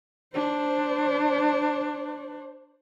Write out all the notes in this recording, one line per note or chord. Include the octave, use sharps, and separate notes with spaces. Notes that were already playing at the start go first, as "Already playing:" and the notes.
D4 C5